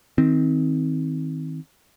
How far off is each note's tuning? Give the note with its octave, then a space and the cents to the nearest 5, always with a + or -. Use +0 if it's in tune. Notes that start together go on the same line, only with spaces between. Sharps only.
D#3 +25 C4 +0